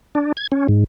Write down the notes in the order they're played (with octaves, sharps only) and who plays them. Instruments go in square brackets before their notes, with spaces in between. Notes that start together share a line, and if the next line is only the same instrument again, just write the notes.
[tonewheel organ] D4
G#6
C#4
G#2